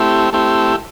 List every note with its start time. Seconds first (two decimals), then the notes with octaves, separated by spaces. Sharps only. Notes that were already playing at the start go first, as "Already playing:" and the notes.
Already playing: A3 C4 E4 G4
0.33 A3 C4 E4 G4